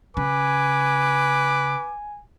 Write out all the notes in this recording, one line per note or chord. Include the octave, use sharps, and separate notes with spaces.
C#3 B4 G#5 D6